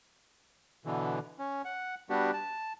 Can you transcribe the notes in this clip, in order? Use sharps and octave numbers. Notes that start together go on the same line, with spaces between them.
B2 D3 E3
C#4
F#5
G3 B3 D4 F#4 G4
A5